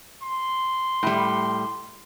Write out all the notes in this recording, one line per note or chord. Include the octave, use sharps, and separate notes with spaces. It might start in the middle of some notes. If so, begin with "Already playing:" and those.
C6
A2 G3